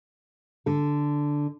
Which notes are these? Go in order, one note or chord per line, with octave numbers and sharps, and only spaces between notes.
D3 A4